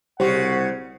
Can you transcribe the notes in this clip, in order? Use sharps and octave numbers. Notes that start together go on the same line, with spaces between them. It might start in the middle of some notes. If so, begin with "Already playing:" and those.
C2 C#3 G3 F#4 C5 F#5